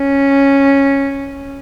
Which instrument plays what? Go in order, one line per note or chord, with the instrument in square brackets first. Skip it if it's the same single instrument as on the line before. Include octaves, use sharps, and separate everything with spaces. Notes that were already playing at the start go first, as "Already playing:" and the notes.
Already playing: [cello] C#4